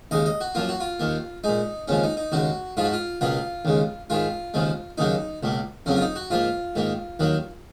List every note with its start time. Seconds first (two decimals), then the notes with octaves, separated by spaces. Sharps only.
0.11 D#2 C#3 G#3 D#5
0.26 D#5
0.41 F#4
0.55 F#2 F3 A#3 F4
0.69 F#4
0.80 F4
1.00 D#2 D#3 A#3
1.44 A#2 G#3 D#4
1.88 D#2 C#3 F3 G#3 C#4
2.04 D#4
2.17 D#4
2.32 D#2 C#3 G#3 F#4
2.77 G#2 F3 G#3 F4
2.84 F#4
2.93 F4
3.21 C#2 B2 A#3 F4
3.65 D#2 C#3 G#3
4.10 G#2 D#3 G#3 F4
4.54 D#2 C#3 F3 G#3
4.98 D#2 C#3 F#3 A#3 D#4
5.43 C#2 B2 A#3
5.86 F2 C#3 F#3 A#3 C#4
5.96 F4
6.01 D#4
6.16 F#4
6.30 G#2 F3 A#3 F4
6.76 G#2 D#3 A#3
7.20 D#2 D#3 F#3 A#3